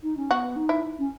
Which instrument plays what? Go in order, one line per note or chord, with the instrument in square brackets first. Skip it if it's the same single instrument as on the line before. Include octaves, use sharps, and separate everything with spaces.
[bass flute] D#4
C#4
[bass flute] B3 [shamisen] F#4
[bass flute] D#4
[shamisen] E4
[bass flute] C#4